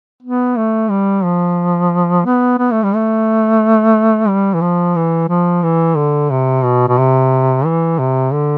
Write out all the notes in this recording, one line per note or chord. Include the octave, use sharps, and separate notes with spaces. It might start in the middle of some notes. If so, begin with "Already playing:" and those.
B3
A3
G3
F3
B3
B3
A3
G3
A3
G3
E3
F3
E3
F3
E3
D3
C3
B2
B2
C3
E3
C3
D3